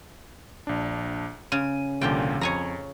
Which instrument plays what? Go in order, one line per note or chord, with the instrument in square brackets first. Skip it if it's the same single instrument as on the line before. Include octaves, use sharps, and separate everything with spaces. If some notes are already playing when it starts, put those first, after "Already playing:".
[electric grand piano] A#1 D4
[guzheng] C#3 [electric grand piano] D#7
[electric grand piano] C2 A#2 D3 [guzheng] F3 G4 G5
[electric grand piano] F2 [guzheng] C#5 G#5 A#5